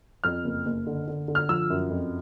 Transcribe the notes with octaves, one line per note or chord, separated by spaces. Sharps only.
F2 F6
F#1
F#1
D3
D3
D3
F6
F3 E6
F#2
F2